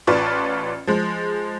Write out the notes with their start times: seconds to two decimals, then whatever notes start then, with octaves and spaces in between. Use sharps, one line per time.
0.07 A1 F4 B4 D5 A5 C#6
0.87 F3 G#3